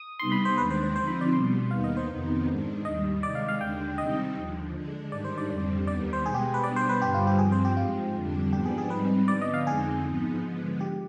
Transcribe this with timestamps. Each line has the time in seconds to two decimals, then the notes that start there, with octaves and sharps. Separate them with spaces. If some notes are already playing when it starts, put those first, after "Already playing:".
Already playing: D#6
0.19 C3 G3 B3 D#4 C6
0.32 B5
0.45 C5
0.58 D#2 D#3 G#3 D4 B4
0.70 C5
0.83 C5
0.96 D3 F3 C4 D#4 C5
1.08 B5
1.21 D5
1.33 B2 G3 B3 C6
1.71 D#2 D#3 B3 D#4 F5
1.84 D#5
1.97 C5
2.10 F2 C3 D#3 B3 D#4
2.47 G#2 D#3 G#3 D4
2.85 D#2 D#3 G3 D#5
3.23 C3 D#3 G#3 D5
3.35 F5
3.48 F5
3.61 D#2 D3 G#3 D4 G5
3.98 C3 D#3 G3 C4 D#4 D#5
4.36 D#2 D3 F3
4.74 D3 G#3 D4
5.12 G#2 D#3 G3 D4 D5
5.25 C5
5.38 D5
5.49 F2 D3 G3 C4 D5
5.87 D#2 D#3 G3 B3 D5
6.13 C5
6.26 B2 G#3 B3 G#4
6.34 G4
6.54 B4
6.63 B2 G3 B3 D4 D5
6.76 C5
6.89 B4
7.01 G2 D3 G3 G4
7.14 F4
7.27 G4
7.39 G2 F3 C4 G#4
7.52 C5
7.65 G4
7.77 G#2 F3 G#3 F4
8.14 F2 D3 G3 D4
8.53 G#2 F3 B3 D4 G4
8.66 G#4
8.78 G#4
8.90 G#2 G3 C4 D#4 B4
9.28 D3 F3 B3 D5
9.42 D#5
9.54 F5
9.66 F2 D3 G#3 C4 D#4 G#4
10.04 G#2 F3 B3 D#4
10.42 D3 F3 G#3 B3
10.81 G4